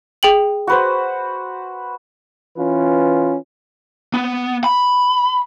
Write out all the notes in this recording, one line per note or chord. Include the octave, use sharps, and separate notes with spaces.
G#4 G5 F#7
F#4 B4 C5
E3 C#4 F4 B4
B3
B5